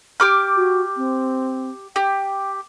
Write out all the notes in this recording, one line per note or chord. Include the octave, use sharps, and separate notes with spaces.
G4 D6 F6
F#4
C4
G4 G5